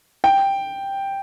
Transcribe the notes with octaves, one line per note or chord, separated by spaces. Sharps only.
G5